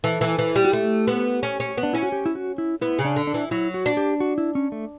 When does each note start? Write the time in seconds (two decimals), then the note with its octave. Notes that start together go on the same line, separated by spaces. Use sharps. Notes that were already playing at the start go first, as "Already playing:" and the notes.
0.04 E3 A4
0.21 E3
0.39 E3
0.56 G3
0.65 F#4
0.73 A3 G4
1.07 B3
1.43 C#4
1.60 C#4
1.77 B3
1.83 D4
1.93 C#4 E4
2.03 F#4
2.12 G4
2.26 E4
2.35 F#4
2.58 E4
2.81 B3 E4
2.99 C#3
3.05 D4
3.16 D3
3.27 D4
3.34 E3
3.51 F#3 E4
3.74 F#4
3.86 D4
3.97 G4
4.20 F#4
4.38 E4
4.55 C#4
4.72 A3